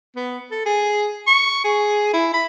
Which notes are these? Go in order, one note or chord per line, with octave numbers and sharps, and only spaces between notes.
B3
A4
G#4
C#6
G#4
E4
B5